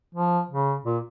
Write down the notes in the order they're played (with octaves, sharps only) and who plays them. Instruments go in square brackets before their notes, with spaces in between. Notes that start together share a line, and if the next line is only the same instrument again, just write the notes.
[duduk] F3
C#3
A#2